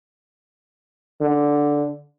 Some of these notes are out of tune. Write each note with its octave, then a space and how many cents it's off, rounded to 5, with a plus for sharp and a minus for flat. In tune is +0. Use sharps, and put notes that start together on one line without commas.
D3 -5